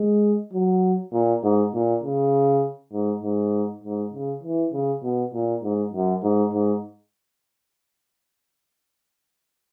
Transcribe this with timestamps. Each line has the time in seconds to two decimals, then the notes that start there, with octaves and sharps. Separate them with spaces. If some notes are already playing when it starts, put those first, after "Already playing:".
Already playing: G#3
0.53 F#3
1.13 A#2
1.44 G#2
1.74 A#2
2.04 C#3
2.93 G#2
3.23 G#2
3.84 G#2
4.14 C#3
4.43 E3
4.73 C#3
5.04 B2
5.34 A#2
5.63 G#2
5.93 F#2
6.24 G#2
6.54 G#2